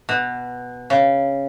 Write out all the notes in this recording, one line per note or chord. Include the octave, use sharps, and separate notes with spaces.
B2
C#3